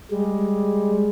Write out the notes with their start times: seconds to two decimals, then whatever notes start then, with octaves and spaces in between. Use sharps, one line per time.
0.11 G3 G#3